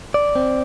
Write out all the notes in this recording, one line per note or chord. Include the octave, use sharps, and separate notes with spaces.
D5
C4